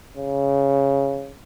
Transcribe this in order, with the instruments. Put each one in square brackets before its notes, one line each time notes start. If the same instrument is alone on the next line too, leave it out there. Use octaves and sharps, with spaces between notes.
[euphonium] C#3